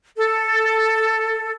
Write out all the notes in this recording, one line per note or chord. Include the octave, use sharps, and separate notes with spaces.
A4